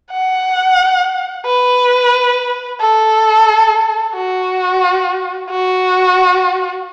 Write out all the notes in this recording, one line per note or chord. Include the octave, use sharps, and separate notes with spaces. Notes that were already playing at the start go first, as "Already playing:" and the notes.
F#5
B4
A4
F#4
F#4